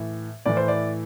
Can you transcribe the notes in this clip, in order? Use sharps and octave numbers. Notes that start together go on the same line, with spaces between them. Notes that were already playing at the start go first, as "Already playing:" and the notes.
Already playing: A2 E3
A2 E3 D5
C5
D5